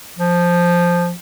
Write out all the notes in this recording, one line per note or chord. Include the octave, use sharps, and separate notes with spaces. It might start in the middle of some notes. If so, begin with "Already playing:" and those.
F3